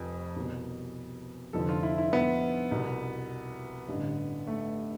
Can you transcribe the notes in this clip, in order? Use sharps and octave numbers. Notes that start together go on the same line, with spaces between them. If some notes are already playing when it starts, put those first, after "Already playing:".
Already playing: F1 F2 F3
C2 B2
F1 F2 D3 F3 A4
F4
E4
E4
B3
C2 B2
A1 G2 D3
A3